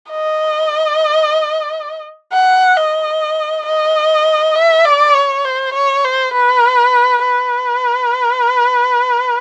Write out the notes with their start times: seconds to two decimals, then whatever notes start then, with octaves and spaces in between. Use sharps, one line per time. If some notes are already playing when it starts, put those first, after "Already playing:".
0.10 D#5
2.33 F#5
2.77 D#5
3.66 D#5
4.55 E5
4.85 D5
5.15 C#5
5.45 C5
5.74 C#5
6.04 C5
6.34 B4
7.23 B4